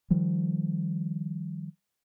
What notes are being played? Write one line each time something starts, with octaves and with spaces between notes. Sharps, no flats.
D#3 F3 G3